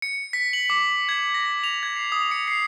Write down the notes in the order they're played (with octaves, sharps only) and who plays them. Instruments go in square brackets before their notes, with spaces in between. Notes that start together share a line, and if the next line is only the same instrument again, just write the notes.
[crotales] C#7
B6
F#7
D6
G#6
A#6
F7
G#6
C7
D#6
C#7
C7